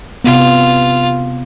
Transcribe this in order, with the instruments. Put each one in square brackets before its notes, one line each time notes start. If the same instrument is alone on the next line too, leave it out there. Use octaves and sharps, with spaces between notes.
[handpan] C3 B3 [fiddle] F4